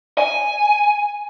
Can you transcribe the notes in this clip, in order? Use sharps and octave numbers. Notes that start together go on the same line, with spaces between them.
G#5